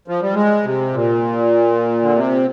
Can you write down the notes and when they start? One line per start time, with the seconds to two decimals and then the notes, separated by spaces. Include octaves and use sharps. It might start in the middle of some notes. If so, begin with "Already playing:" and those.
0.08 F3
0.22 G3
0.34 G#3
0.64 C3
0.94 A#2
2.02 D3
2.15 C3